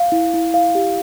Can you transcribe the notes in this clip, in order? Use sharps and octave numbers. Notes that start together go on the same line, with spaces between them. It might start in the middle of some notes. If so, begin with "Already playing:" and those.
Already playing: F5
E4
E4
F5
G4